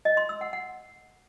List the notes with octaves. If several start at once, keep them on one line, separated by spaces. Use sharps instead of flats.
D#5
C6
E6
F#5
F#5